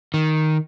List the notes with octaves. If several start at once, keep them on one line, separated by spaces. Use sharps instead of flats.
D#3